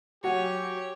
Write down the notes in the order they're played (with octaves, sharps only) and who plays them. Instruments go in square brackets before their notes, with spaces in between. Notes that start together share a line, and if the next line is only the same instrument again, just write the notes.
[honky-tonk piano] F#3 [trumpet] G4 [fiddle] C#5 [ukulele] F#5 G#5